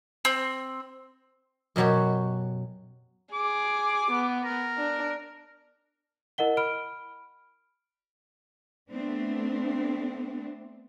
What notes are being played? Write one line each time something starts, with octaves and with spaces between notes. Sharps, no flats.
C4
F#2 B2 F#3 G4 C#5
G#4 D6
B3
A#4
D4
E4 A#4 D#5 F#5 G7
B5 F6 D7
A3 B3 C4 D4